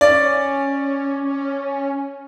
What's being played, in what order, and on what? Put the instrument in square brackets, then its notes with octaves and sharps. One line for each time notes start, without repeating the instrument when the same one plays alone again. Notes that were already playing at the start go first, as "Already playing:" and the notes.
[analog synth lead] C#4 [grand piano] D5